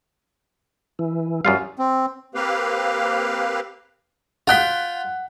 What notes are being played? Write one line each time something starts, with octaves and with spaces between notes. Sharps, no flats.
E3
F#2 G3 F4 F5
C4
A#3 C4 G4 B4 F5
F4 F#5 G5 C6 F#6 B6